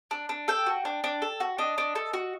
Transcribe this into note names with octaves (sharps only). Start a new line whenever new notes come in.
D4
D4
A4 G5
F#4
D4
D4
A4
F#4
D4 D#5
D4
A4
F#4